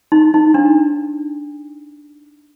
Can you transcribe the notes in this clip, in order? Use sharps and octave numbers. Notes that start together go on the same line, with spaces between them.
D#4
D#4
D4